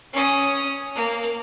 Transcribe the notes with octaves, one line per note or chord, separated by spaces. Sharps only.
C#4 D#6
A#3